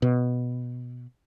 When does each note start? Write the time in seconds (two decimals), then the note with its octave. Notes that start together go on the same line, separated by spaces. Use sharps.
0.02 B2